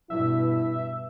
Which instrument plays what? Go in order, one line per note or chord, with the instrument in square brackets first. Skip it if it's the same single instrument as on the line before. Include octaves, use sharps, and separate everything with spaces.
[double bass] G2 B2 [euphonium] E4 [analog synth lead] E5